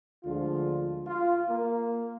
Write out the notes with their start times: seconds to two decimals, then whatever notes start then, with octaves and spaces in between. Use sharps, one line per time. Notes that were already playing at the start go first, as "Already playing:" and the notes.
0.24 D2 D3 F3 G#3 F4
1.06 F4
1.48 A#3